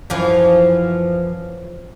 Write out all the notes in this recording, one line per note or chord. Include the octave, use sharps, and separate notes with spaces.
F#2 E3 F3